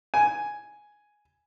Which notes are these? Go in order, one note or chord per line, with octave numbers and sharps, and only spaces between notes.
G#5